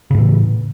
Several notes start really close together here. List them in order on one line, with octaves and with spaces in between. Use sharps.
C#3 A2 E3